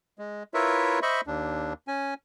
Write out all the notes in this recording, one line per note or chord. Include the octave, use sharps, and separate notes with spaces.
G#3
E4 F4 A#4 B4 C#5 E5
C5 D#5 E5 B5 C#6
D#2 D4
C#4 G#5